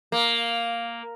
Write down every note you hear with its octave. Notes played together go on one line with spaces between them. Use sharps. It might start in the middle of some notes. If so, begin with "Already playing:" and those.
A#3